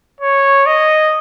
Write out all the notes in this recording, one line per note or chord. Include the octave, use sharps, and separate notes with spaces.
C#5
D#5